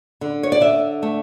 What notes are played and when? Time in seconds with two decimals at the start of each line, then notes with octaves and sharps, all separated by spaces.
0.21 D3
0.43 C#5
0.52 D5
0.61 D3 E5
1.03 A3